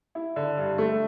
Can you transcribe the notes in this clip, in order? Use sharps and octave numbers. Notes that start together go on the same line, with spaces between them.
E4
D3
G2
A3